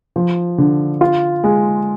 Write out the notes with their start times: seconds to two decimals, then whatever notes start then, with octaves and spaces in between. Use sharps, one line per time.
0.16 F3
0.58 D3
1.01 F4
1.44 G#3